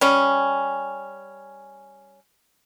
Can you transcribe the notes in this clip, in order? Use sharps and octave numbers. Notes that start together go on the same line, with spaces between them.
G3 C#4